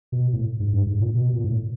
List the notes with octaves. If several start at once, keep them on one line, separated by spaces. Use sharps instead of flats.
B2
A2
G#2
G2
G#2
A#2
B2
A#2
A2